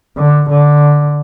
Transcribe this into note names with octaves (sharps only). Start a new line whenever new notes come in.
D3
D3